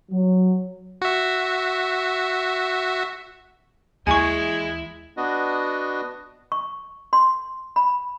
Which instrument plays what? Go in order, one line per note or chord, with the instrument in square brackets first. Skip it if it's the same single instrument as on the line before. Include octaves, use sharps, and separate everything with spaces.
[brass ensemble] F#3
[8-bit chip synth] F#4 E5
[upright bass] D#2 E3 [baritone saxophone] G#3 [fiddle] E4 [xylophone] G#5 C#6
[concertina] B3 D4 F#4 D#5
[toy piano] C#6
C6
B5